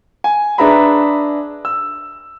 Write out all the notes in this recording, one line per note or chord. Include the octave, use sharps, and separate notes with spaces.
G#5
D4 G#4 B4 E5 A#5 B5
E6